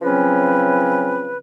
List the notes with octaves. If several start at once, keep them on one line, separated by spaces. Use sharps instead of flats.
C#3 F3 F#3 C4 C#4 B4